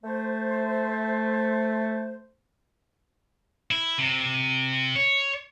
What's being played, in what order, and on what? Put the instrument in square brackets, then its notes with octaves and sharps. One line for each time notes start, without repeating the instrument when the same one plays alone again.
[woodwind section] A3 C5
[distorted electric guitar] E4
C3
C#5